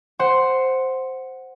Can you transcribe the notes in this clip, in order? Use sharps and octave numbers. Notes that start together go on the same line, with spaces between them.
C5 F#5 C6